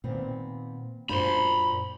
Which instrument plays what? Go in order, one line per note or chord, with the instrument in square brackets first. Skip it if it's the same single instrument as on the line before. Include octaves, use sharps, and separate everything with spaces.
[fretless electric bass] A#2 D#3 [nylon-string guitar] B3 C4
[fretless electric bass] F#2 D4 [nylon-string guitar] A#2 C5 [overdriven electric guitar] B5 C6